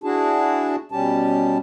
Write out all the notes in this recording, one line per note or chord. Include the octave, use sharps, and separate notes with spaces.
D4 E4 F#4 G#4 A5
B2 G3 C#4 G4 A5